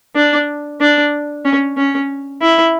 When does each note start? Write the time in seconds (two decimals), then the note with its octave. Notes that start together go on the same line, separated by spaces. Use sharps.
0.15 D4
0.81 D4
1.45 C#4
1.77 C#4
2.41 E4